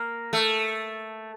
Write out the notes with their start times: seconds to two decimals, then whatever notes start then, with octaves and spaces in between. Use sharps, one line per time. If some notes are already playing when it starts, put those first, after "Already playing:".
Already playing: A#3
0.33 A3